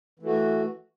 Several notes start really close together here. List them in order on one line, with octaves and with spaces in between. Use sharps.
E3 A3 F#4